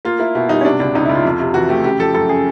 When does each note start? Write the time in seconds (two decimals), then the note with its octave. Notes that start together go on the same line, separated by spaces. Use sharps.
0.05 A#3 F4
0.19 A#3 E4
0.35 B2 E4
0.49 G3 D#4
0.61 C#4
0.65 C3 D4
0.80 C#2 D4
0.95 C#2 D#4
1.05 C#2 E4
1.15 F4
1.25 F2
1.40 C3
1.54 E3 F#4
1.69 A3 G4
1.84 C#3 G4
1.99 F3 A4
2.14 F#2 A4
2.29 C#3 G#4